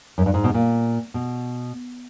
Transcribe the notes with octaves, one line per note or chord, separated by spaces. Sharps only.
F#2
G2
G#2
B2
A#2
B2